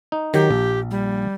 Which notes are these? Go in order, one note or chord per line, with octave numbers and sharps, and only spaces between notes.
D#4
D#3 F#3 G4
A#1
G3